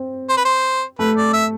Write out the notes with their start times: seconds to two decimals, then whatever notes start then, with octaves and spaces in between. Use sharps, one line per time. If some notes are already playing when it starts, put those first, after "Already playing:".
Already playing: C4
0.29 C5
0.37 B4
0.45 C5
0.99 A3 B4
1.17 D5
1.33 E5